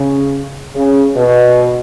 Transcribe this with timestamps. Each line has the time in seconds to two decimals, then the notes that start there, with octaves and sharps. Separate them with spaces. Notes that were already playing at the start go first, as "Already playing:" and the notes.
Already playing: C#3
0.75 C#3
1.16 B2